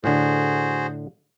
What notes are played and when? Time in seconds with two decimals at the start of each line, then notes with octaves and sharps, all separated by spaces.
0.04 A2 D3 F#4 G#4 C5